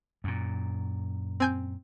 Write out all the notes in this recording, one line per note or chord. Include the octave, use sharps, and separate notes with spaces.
F#2 A#2
C4 G#5 G6